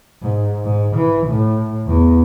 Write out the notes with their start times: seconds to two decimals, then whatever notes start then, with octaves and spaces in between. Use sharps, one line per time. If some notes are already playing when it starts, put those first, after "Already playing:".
0.22 G#2
0.64 G#2
0.97 E3
1.27 A2
1.87 E2